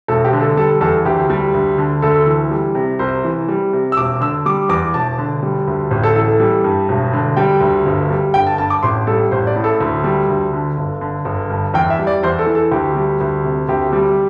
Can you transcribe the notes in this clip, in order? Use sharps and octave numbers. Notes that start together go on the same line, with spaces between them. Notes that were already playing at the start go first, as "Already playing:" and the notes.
E1 A4
G4
D3
A4
G3 A4
E2 A4
D2 G4
G3
D2
D3
D2 A4
E3
G3
C3
C2 C5
E3
G3
C3
E6
E1 D6
D3 E6
G3 D6
E2 D6
E1 A5
D3
G3
D2
A1
A4
E3 A4
A4
G3
G2
E1
D3
G3 G5
D2
G1
G3
G1 G5
A5
G2 A5
D6
A1 C6
G3 A4
A1 C5
D5
A2
A4
D2
G3
D2
D3
G1
D3
G1
G2
E2 G5
E5
G3
D5
E2 C5
A4
E3
A4
D2 G4
G3
D2
C3
D2 G4
G3